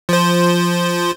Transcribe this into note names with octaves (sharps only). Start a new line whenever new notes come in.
F3 C5